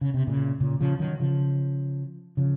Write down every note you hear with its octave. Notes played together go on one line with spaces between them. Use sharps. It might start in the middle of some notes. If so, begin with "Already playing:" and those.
C#3
C3
A#2 C#3
A#2 C#3
C#3 F3
D#3 F#3
C#3 F3
C#3 F3